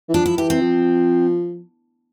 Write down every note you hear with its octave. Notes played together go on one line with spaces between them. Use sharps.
E3
F3 D4
E4
E3 G4
C4
F3